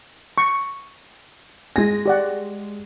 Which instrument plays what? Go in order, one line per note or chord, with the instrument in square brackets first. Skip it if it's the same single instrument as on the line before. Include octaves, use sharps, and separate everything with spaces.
[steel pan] C#6
[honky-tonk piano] G#3 A#6 [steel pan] G#5
[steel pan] G4 D5 F#5